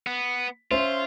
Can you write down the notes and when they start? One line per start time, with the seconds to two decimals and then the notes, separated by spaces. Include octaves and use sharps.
0.07 B3
0.71 C#4 F4 C5 E5